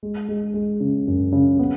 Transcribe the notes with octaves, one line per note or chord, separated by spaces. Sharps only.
G#3
G#3
G#3
C#3
F#2
C#3
B3